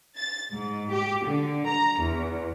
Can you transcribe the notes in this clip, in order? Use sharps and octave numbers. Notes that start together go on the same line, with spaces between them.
A6
G#2
G4
D3
A#5
E2